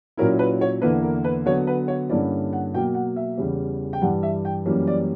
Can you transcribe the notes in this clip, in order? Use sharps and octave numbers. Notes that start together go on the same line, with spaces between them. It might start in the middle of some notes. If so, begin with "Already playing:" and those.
A#2 F#3 C#4 E4 A#4
B4
C#5
E2 D3 A#3 E4 B4
A#4
B4
D3 F#3 B3 C#5
B4
C#5
G2 D3 A#3 C#4 E4 D5
F#5
B2 F#3 A#3 G5
F#5
E5
E2 C#3 E3 G3 C#4
G5
G2 E3 G3 F#5
E5
G5
F#2 E3 G3 A#3 C#4
D5